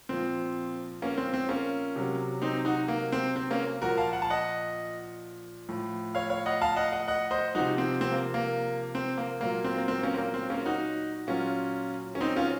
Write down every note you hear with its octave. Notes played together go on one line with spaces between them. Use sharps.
A#2 F3 C4
A#3 C#4
C4
C4
A#3 C#4
C3 F#3
C4 D#4
D#4 F#4
A#3
C4
C4
A#3 C#4
A#2 F3 F#4 A#4
F5 A5
F#5
A5
D#5 F#5
A2 F3
C#5 F5
C#5 F5
D#5 F#5
F5 A5
D#5 F#5
D#5 F#5
D#5 F#5
C5 D#5
C3 F3 D#4 F#4
C4
C4
A#3
A#3
C4
A#3
A#2 F#3 A#3
C4
A#3
C4
A#3 C#4
C4
A#3
C4
A#3 C#4
D#4 F#4
A#2 F#3 C#4 F4
C#4
C4 D#4
C#4 F4